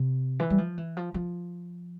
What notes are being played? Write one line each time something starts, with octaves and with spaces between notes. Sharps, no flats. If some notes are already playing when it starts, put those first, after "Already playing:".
Already playing: C3
E3
G3
F3
E3
F3
F3